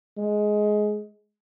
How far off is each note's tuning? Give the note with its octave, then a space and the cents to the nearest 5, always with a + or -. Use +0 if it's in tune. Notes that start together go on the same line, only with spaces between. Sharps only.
G#3 +15